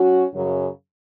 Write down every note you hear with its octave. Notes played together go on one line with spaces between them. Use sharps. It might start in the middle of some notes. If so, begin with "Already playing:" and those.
Already playing: F#3 C#4 F#4
F#2 C#3 F#3